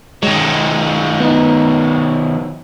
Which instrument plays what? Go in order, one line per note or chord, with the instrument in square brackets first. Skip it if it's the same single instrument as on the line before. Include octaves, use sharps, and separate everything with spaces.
[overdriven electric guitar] D#3 F#3 [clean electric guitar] G#3
[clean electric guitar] B3 D#4